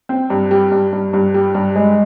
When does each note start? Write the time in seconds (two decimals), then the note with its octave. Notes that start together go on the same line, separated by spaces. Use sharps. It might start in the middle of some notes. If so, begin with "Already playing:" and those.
0.09 C4
0.30 G2
0.51 G3
0.72 G2
0.93 G2
1.13 G2
1.34 G3
1.55 G2
1.75 G#3